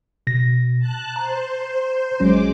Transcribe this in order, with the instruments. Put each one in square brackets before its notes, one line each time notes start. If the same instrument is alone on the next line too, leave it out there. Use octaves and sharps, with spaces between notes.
[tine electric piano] B2 A#6
[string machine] A5 F#6
[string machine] C5 [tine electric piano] A#5
[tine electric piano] A1 F#3 C#4 [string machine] G#3 D6